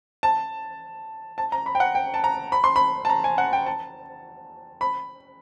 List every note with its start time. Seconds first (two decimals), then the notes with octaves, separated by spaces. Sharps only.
0.23 A5
1.38 A5
1.52 A#5
1.66 B5
1.75 G5
1.80 F#5
1.95 G5
2.14 A5
2.24 A#5
2.52 B5
2.64 C6
2.76 B5
3.05 A5
3.10 A#5
3.24 G#5
3.38 F#5
3.53 G5
3.66 A5
4.81 B5